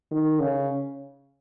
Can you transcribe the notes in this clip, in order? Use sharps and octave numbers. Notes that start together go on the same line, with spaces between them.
D#3
C#3